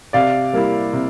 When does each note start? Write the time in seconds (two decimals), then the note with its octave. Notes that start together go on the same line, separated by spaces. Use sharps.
0.13 C3 D5 F5
0.53 G3 A#3 E4
0.93 C3